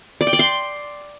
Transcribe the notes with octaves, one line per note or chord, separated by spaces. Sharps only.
D5
G5
D5
C6